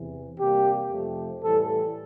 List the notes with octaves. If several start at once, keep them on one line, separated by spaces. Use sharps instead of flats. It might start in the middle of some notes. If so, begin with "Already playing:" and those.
Already playing: E2 C3 E3
C3 G3 A#3 G4
F2 C3 F3 A3
A2 E3 G3 A4